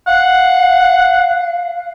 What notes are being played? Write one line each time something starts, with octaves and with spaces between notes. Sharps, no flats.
F5 F#5